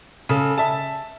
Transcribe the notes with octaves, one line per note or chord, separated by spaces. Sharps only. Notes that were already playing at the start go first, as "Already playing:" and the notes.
C#3 A4
E5 A5